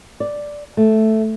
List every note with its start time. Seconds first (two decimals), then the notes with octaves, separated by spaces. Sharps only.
0.20 D5
0.77 A3